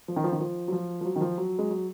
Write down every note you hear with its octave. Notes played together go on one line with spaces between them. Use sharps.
F3
D#3
F3
D#3
F3
F#3
F3
F3
F#3
D#3
F3
F#3
G#3
F#3